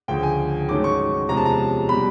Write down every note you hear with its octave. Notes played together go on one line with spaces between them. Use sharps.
D2 C#3 F3 G5
G#5
G#2 D#3 F#3 A3 C#4 D6
C#6
E2 C3 F3 G#3 C#4 A#5
A5
A#5
B2 G3 B5